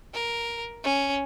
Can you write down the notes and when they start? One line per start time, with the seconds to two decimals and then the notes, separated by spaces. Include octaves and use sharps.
0.13 A#4
0.84 C#4